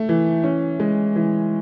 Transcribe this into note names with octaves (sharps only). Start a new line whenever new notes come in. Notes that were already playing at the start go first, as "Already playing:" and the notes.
Already playing: A3
E3
C#4
G#3
E3